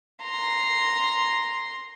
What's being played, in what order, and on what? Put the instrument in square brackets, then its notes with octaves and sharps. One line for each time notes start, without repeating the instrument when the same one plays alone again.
[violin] A#5 C6